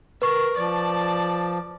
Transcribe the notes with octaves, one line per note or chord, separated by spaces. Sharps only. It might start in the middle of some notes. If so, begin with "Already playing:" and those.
A#4 B4 C#6
F3 D5 A5